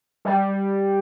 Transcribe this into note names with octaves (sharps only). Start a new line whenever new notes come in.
G3